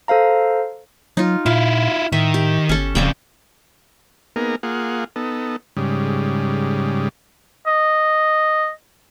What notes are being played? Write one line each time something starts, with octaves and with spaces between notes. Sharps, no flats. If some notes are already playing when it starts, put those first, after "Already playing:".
A4 C5 F5 A#5
F#3 D#4 F4
A#2 E4 F4 F5
A2 D#3 E5
G4
G1 C#4 A4
D#1 F2 C#3 C4 D5 G5
A#3 B3 D#4 G#4 A#4
A#3 F4 G#4 F#5
B3 D#4 A4
G#2 C#3 G3
D#5